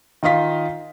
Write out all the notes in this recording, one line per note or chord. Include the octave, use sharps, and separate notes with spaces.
D#3 F4 D#5 F5 B6